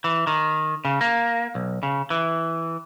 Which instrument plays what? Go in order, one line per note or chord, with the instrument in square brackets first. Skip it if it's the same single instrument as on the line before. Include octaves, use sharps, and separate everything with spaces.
[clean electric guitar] E3
D#3
C#3
A#3
B1
C#3
E3